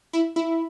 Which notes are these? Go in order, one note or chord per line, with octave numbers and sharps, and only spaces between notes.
E4
E4